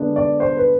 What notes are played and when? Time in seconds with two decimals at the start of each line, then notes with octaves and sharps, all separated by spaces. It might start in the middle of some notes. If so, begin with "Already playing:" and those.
Already playing: D3 G#3 B3 D4
0.16 D5
0.40 C5
0.57 B4